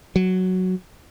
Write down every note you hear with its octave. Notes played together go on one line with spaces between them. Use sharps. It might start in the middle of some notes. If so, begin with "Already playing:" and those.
F#3